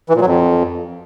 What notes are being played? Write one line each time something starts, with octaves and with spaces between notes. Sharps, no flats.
E3
A#2
F#3
F2